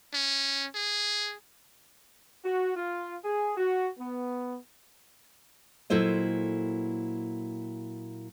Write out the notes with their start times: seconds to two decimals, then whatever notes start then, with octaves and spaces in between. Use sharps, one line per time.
0.14 C#4
0.75 G#4
2.44 F#4
2.75 F4
3.23 G#4
3.57 F#4
3.98 B3
5.90 A#2 F#3 E4 A4 C5 D#5